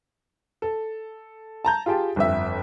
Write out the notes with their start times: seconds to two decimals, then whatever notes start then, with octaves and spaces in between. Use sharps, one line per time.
0.62 A4
1.65 A5 A#5 G6
1.86 F4 G4 G#4 G5 A5
2.16 G1 F2 E5